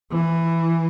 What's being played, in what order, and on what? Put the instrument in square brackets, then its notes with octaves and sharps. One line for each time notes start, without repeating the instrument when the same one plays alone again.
[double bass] E3